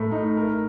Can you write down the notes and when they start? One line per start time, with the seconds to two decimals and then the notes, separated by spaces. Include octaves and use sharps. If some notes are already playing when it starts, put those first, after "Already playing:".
Already playing: A2 A3 A#4
0.12 D#4
0.37 A#4